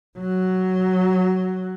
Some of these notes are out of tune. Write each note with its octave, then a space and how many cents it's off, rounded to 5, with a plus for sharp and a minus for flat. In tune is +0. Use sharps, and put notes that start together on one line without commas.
F#3 +5